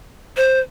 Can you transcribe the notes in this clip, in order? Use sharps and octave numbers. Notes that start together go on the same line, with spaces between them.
C5